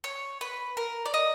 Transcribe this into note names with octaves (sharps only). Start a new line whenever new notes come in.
C#5
B4
A#4
D5
D#5